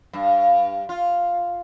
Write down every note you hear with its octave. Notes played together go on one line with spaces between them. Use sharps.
G2
F4